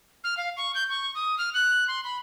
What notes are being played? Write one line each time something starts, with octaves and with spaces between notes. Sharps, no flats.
F6
F5
C#6
G6
C#6
D#6
F6
F#6
C6
B5